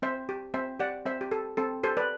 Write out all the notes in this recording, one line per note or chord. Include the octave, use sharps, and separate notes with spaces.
C4 C5 E5
G4
C4 C5 E5
G4 D5 F#5
C4 C5 E5
G4
G4 A4
C4 A4
G4 A4 C5
B4 D5